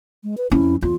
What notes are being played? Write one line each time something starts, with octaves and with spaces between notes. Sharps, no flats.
G#3
B4
F2 C#4 E4
E2 F4